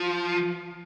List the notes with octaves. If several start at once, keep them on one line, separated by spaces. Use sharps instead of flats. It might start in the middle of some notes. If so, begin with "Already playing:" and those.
Already playing: F3